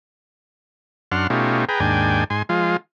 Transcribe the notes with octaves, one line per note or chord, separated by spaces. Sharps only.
F#2 D4 F#5 C6 F6
B2 A3 C#4 D#4 F4 G4
G#4 B4 G5 A#5
D#2 G#2 D4 G5 G#5
G#2 G#5 C6
F3 G#3 F4